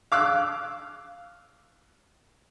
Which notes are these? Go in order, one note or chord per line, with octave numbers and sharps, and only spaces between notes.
F5 D6 E6 F#6